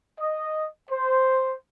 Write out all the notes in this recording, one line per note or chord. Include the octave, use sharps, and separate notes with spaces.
D#5
C5